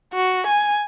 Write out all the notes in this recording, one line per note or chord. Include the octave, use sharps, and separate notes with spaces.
F#4
G#5